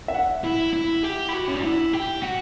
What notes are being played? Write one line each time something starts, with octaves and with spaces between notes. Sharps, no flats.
E5
F#5
E4
E4
G4
E4
F#4
C#4
D4
E4
G4
F#4